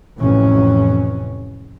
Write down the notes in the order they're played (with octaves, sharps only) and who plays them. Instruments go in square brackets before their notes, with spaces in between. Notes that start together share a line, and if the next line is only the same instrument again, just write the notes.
[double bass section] A1 F2 C3 E3 C#4